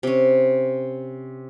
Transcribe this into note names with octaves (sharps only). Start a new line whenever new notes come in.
C3 C#4